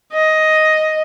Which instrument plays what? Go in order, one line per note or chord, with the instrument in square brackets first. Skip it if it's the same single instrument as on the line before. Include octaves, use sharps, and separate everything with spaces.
[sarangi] D#5